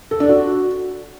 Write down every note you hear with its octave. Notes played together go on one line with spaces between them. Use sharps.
A4
D4
F#4